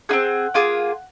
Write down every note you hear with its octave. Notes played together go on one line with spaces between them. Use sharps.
C4 D#4 G#4 F#5
A#3 F4 G#4